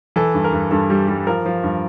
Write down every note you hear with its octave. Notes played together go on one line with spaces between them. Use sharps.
E3 A4
G2
A#4
G2
G2 A4
G3
G3
F3 A#4
F3
G2